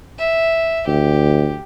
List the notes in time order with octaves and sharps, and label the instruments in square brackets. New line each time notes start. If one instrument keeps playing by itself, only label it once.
[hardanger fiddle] E5
[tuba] D2 [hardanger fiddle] G4